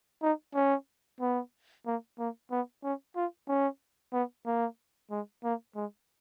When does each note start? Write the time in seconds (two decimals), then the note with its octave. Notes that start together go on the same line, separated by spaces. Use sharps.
0.23 D#4
0.55 C#4
1.21 B3
1.86 A#3
2.19 A#3
2.51 B3
2.84 C#4
3.16 F4
3.48 C#4
4.13 B3
4.46 A#3
5.11 G#3
5.44 A#3
5.75 G#3